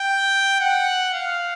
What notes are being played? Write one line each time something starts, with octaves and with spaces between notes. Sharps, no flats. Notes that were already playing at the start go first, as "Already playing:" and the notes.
Already playing: G5
F#5
F5